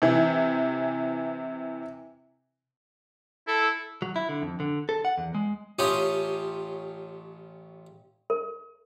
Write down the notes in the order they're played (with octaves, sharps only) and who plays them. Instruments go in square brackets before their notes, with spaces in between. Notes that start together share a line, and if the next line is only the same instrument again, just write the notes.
[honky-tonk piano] C3 E3
[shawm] E4 [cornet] A4
[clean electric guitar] F#3
E4
D3
F2
D3
A4
F#5
E2
G#3
[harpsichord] A1 C#4 F4 G4 G#5 D#6
[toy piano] A#4